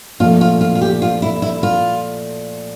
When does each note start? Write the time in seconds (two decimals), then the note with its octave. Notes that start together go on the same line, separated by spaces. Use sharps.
0.20 A#2 F3 A3 F4
0.41 F4
0.61 F4
0.75 F4
0.81 G4
1.02 F4
1.22 E4
1.42 E4
1.63 F4